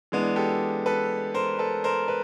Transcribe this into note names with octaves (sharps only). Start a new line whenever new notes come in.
E3 G#3 B3 D4
G4 A4
A4 B4
A#4 C5
A4 B4
A#4 C5
B4